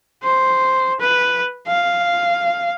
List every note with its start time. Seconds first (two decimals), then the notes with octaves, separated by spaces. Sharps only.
0.23 C5
1.00 B4
1.68 F5